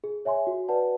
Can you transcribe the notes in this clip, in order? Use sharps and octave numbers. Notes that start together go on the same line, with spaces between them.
G#4
C#5 E5 G#5 C6
F#4
B4 D5 F#5 A5